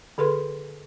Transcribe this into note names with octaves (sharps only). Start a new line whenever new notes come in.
D3 G#4 A4 B4 C6